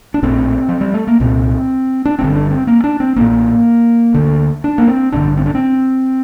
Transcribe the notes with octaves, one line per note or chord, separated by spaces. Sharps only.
D4
A#1 A2 C4
F3
G3
A3
A#3
C2 A#2 C4
D4
G1 G2 D3 C4
D4
C4
A#3
D4
C4
A1 A2 A#3
D2 D3
D4
A#3
C4
A1 G2 D3 D4
C4
D4
C4